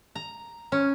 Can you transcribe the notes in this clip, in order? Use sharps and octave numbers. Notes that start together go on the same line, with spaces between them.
A#5
C#4